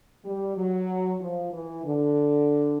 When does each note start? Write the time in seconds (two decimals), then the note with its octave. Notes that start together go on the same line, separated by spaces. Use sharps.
0.25 G3
0.57 F#3
1.21 F3
1.53 E3
1.84 D3